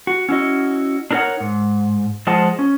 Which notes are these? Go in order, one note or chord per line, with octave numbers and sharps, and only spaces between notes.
F#4
C#4 E4 F#4 D#5
D4 D#4 A#4 C5 C#5 F#5
G#2
F3 G#3 C5 D#5 F#5 A5
C#4